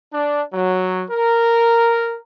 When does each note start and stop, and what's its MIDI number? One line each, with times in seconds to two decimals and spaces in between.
0.13 0.42 62
0.53 1.03 54
1.10 2.19 70